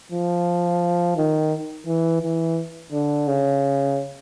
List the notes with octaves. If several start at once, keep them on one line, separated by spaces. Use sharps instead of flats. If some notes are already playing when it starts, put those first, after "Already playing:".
F3
D#3
E3
E3
D3
C#3